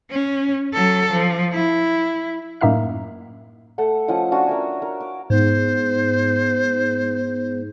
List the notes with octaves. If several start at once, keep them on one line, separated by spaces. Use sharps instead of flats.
C#4
F#3 A4
F3
E4
F#2 A2 A#3 D#4 E5 F6
A3 A4 F#5
F3 C#4 D#5 F#5
C#4 D4 F4 F#4
A#4 E5 G#5
A#4
D6
G#2 B3 C5